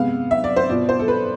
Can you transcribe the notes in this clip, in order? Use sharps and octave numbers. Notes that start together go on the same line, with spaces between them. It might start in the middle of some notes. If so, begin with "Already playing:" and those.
Already playing: C3 G#3 B3 F5
E5
D5
C5
B2 B3 F4 D5
C5
A4
B4